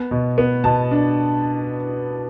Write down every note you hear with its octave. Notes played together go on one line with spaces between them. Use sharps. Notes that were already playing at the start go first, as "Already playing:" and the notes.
Already playing: B3
B2
B3
B2 A5
D4